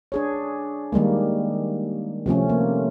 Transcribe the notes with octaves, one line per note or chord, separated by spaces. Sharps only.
D4 G#4 C#5
D#3 G3 G#3 A#3
C3 F3 A3 C#4
A#3